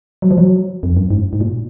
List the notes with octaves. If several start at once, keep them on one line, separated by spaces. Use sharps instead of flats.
F#3
F3
F#3
F2
F#2
G#2
G#2
A#2